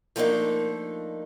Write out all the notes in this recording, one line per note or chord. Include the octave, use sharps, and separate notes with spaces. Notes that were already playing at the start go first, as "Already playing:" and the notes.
F3 A3 A#3 D4 D#4